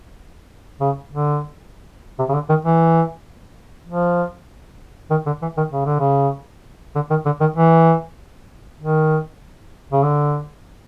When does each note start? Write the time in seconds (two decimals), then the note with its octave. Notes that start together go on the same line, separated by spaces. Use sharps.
0.80 C#3
1.12 D3
2.19 C3
2.29 C#3
2.34 D3
2.49 D#3
2.65 E3
3.87 F3
5.10 D#3
5.26 D3
5.42 E3
5.57 D#3
5.72 C#3
5.86 D3
5.99 C#3
6.95 D3
7.10 D#3
7.25 D3
7.40 D#3
7.56 E3
8.79 D#3
9.92 C#3
10.03 D3